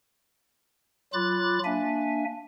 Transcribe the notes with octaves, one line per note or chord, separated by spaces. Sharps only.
F#3 F4 B5 D6 F#6 A6
A#3 D4 E5 G#5